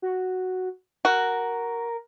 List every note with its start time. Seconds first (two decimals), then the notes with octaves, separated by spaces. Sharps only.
0.02 F#4
1.05 F#4 A#4